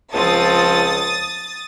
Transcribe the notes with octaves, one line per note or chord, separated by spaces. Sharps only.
C#2 F3 C4 A4 D#6 A6